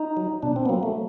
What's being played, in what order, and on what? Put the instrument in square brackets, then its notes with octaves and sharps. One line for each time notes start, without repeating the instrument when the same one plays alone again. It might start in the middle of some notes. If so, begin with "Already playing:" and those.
Already playing: [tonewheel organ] D#4
F#3
B2 D4
C4
B3
F#3 A#3
A3